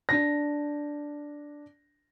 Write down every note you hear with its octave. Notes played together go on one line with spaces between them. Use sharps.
D4 A#6